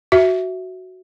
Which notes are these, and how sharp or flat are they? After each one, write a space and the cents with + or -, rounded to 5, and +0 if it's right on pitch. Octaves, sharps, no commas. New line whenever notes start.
F#4 +0 E5 +0